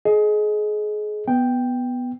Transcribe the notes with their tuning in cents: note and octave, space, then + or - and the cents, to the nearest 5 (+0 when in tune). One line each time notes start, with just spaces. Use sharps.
G#4 +25 D#5 +0
B3 +0 G5 +0